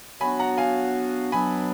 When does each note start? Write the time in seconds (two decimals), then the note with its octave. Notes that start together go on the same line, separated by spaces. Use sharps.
0.20 F#3 B3 D4 F#4 G#5 B5
0.39 F#5 A#5
0.57 F5 G#5
1.32 B2 F#3 B3 D4 G#5 B5